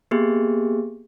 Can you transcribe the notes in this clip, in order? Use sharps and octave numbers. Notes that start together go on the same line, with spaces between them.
A#3 B3 G4 G#4